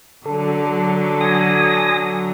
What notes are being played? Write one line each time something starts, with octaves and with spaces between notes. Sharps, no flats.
D3 F#3 A4
G#5 D#6 A#6